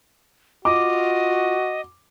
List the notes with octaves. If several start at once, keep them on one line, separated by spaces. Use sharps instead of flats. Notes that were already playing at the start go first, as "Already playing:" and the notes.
F4 F#4 D#5 D6